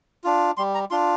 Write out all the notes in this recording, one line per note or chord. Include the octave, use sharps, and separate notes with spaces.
D4 F4
G3 C6
A#5
D4 F4 C6